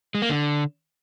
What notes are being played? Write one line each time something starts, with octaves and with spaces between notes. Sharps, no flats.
G#3
A#3
D3